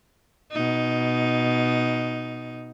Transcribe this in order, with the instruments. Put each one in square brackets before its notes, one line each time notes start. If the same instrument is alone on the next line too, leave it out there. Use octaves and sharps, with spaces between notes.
[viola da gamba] B2 D#4